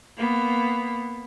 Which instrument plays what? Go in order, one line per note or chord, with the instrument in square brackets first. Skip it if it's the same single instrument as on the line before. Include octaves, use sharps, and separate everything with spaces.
[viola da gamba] A#3 B3